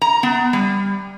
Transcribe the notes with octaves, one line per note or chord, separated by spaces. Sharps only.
A#5
B3
G3